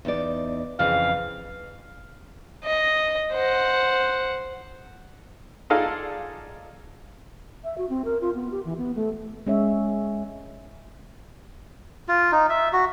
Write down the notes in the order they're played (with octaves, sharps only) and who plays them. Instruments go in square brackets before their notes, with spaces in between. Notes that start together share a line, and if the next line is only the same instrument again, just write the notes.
[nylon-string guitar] E2 D#4 D5
[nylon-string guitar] F2 C#3 E3 [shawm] F5
[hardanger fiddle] D#5
C5 F#5
[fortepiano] D#4 F4 G#4 A4 D5 F5
[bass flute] E5
F#4
C4
A#4
F4
B3
G4
E3
B3
A3
[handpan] G#3 C#4 C#5 E5
[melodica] F4
D#4
E5
F#4